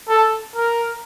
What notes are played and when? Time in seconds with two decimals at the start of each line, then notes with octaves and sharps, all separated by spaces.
0.09 A4
0.56 A#4